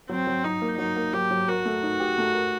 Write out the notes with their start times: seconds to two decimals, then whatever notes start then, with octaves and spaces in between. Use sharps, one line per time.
0.09 F#3 C4
0.27 F#3
0.44 F#3 D#4
0.61 A#3
0.78 F#3 D#4
0.96 A#3
1.13 F#3 G4
1.31 F#3
1.48 F#4 A#4
1.65 A3
1.83 D#4
2.00 G4
2.18 A3
2.34 A#4